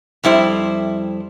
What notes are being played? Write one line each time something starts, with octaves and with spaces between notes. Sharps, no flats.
F2 G3 E4 C5